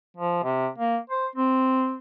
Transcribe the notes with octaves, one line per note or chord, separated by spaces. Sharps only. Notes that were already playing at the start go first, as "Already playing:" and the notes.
F3
C3
A#3
C5
C4